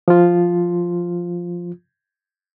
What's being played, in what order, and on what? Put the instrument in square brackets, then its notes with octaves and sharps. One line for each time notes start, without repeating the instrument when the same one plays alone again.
[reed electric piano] F3 F4